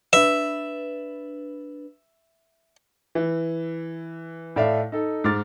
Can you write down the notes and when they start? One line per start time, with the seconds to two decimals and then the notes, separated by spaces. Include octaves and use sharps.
0.13 D4 B4 E5
3.15 E3
4.56 A2 A4 D5 E5 F5
4.92 D#4 A4
5.24 G#2 D6 F6 A6